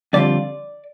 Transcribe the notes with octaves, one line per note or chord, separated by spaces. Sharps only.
F2 D3 G3 C4 F4 D5